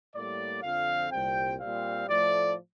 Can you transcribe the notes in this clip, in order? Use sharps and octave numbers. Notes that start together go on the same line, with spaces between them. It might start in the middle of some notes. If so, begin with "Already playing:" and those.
A2 G3 A#3 D5
F2 D3 F3 C4 F5
C2 A#2 G3 C4 G5
A#2 G3 C4 F5
A2 F3 A3 D5